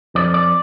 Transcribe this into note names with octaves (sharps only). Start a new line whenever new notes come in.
F2 D5
D5